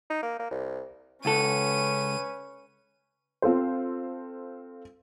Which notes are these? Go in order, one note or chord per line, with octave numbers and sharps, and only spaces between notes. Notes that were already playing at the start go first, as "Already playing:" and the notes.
D#4
A#3
A#3
C2
C#2 C#4 A4 B4 D#7
C4 F4 A4 C5